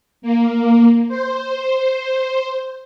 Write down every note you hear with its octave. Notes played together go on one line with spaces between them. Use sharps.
A#3
C5